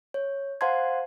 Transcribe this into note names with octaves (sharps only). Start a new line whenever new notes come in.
C#5
C5 F5 F#5 A5 C6 G#6